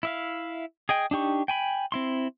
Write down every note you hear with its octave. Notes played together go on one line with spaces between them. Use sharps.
E4 E5 F5
G#4 D#5 G5
D4 D#4 G4 C#6
G5 G#5 B5
C4 E4 C6